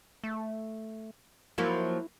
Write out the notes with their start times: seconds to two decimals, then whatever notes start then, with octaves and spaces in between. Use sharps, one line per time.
0.24 A3
1.58 F3 F#3 A#3 E4